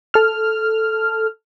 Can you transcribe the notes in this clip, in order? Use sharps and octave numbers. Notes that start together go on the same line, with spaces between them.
A4 F6